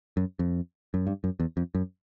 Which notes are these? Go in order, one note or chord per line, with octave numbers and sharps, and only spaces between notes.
F#2
F2
F#2
G2
F#2
E2
F2
F#2